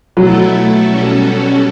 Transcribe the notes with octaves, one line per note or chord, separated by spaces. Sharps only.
B2 F#3 A3 E4 A4
B2 G3 C#4 F#4 A4